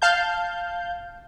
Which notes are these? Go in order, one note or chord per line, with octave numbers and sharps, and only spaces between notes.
F5 A5 G6